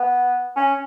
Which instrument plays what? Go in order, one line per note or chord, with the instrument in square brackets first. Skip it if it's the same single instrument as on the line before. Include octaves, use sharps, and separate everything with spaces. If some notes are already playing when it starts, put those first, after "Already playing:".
Already playing: [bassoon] B3
C#4